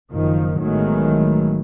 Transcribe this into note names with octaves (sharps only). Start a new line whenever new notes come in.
F#1 D#3 F3
A1 D#3 F#3 G#3 A3 B3